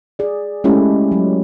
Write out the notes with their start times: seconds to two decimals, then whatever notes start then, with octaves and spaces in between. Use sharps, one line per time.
0.19 G#4 D5
0.64 G#3 A3 C#4 E4 G4
1.12 F#3